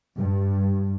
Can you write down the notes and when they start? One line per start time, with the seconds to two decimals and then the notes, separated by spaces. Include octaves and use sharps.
0.17 G2